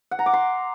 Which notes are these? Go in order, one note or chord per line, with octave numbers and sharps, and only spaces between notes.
F#5
A#5
D6
C6